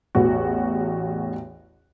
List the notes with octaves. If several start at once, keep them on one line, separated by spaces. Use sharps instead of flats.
A1 E2 F#4